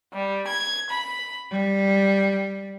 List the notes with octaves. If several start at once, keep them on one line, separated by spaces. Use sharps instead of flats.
G3
G#6
B5
G3